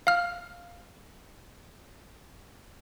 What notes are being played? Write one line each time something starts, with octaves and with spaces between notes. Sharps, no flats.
F5 F6